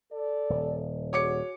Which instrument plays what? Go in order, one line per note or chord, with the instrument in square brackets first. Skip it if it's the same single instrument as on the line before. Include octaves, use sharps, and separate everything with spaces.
[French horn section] A4 D5
[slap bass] D#1
[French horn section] F#4 G#4 [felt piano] C#5 D6 C#7